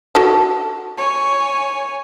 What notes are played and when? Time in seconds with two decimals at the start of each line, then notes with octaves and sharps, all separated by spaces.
0.15 F#4 A4 A5
0.98 C#5 G#5